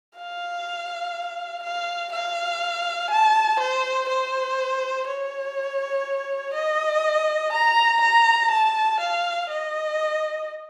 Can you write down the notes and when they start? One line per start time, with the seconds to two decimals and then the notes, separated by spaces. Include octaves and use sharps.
0.16 F5
1.63 F5
2.12 F5
3.10 A5
3.59 C5
4.09 C5
5.07 C#5
6.54 D#5
7.53 A#5
8.01 A#5
8.51 A5
9.00 F5
9.49 D#5